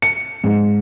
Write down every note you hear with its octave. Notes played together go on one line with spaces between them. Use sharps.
C#7
G#2